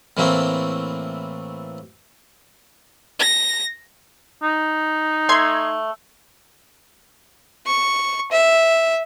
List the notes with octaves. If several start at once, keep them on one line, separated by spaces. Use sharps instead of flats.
A2 E3 A3 A#3 C4
A#6
D#4
A3 C6 G#6
C#6
E5